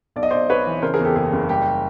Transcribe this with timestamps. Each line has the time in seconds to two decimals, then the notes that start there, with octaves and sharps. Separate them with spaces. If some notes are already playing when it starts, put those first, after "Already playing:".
0.16 B1 D5
0.23 D#5
0.30 B1 C5 D5
0.49 B1 B4 C#5
0.67 E3
0.82 C#3 A#4 C5
0.94 G#4 A#4
0.99 E2
1.04 G4 A4
1.16 F#1 G#4
1.33 F#1
1.49 G3 G4